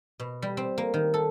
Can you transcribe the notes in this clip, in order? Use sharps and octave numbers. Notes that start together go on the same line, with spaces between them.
B2
G3
C4
A#3
D#3
A4